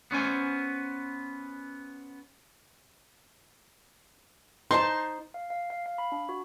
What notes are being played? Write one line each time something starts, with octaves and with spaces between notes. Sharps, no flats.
B3 C#4 C5 G#5
D#4 C5 A5 C6
F5
F5
F5
F5
B5
D4
F#4